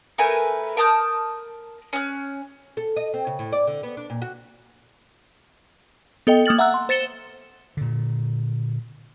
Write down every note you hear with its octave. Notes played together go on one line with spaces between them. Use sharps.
A3 A#4 B4 G#5
A#4 A5 D#6 G6
C#4 F#6
A4
D#5
C4
C#3
A2
D5
D3
B3
D4
A#2
F#4
B3 A4 D#5 G5
A#3 D#6 F6 A6 F#7
E5 F#5 A#5 E6 F#6
C6
C5 A6 C#7 E7 G7
A#2 D3